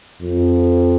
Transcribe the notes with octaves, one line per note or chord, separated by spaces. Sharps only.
F2